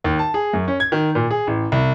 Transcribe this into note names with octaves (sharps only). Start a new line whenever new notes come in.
D#2
A5
G#4
F#2
C#4
G#6
D#3
A#2
G#4
A1
C2